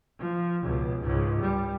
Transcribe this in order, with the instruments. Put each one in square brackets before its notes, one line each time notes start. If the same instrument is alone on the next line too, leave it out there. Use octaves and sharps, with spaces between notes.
[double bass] F3
C#2 B2
C#2 G#2
G3